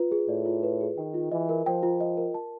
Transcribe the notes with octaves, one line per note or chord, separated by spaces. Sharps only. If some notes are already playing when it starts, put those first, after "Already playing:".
Already playing: F4 B4
G#4
A2 D5
F4
B4
G#4
D#3 G5
F4
E3 D#5
A#4
F3 G5
F4
D#5
A#4
A5